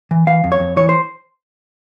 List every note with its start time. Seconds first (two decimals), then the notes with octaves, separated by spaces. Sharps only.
0.11 E3
0.27 E3 F5
0.44 F2
0.52 C#5
0.60 F2
0.76 E3 C#5
0.89 C5